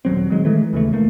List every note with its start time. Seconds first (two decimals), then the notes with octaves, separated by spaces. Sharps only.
0.05 D#1 D#2 F#3 C4
0.30 D#3 F#3 G#3
0.45 D#3 E3 G#3 A3
0.73 D#2 C#3 E3 A3
0.93 F1 A3 A#3